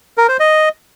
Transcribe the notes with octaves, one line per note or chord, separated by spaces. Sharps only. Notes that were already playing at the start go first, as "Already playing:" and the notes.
A#4
C5
D#5